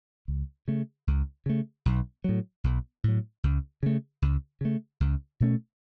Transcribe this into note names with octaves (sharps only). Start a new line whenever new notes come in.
C#2
C#3 A3
C#2
C#3 A3
B1
A2 F#3
B1
A2 F#3
C#2
C#3 A3
C#2
C#3 A3
C#2
B2 A3 C#4